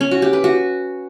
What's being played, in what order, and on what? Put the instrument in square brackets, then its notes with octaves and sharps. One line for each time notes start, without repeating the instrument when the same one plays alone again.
[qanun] C#4
F#4
G4
B4
F#4